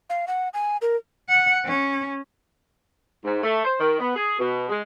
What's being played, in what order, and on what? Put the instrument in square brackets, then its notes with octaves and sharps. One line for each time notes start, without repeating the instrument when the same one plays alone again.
[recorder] F5
F#5
G#5
A#4
[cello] F#5
C#4
[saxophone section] G#2
A3
C5
D#3
B3
G#4
B2
G#3